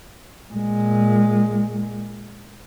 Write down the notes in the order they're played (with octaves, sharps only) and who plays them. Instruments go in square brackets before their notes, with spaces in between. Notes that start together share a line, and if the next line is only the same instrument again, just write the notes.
[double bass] A#2 G#3